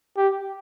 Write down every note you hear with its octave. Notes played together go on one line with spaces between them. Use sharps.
G4